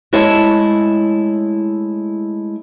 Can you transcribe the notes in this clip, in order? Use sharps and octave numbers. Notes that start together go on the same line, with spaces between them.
G#3 A3 E4 C#5 A5